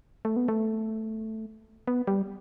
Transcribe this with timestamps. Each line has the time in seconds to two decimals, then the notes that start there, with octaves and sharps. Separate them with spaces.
0.25 A3
0.36 B3
0.48 A3
1.87 B3
2.07 G3